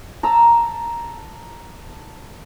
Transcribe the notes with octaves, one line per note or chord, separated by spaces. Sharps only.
A5 A#5 E6